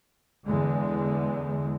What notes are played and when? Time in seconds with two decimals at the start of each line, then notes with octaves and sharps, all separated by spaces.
0.46 E2 D3 G#3